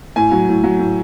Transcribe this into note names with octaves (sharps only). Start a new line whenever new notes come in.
A2 G#5
F#3
A2
F#3
A2